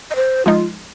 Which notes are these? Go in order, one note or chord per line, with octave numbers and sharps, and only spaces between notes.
D#5
C5
F3 G#3 D#4 F4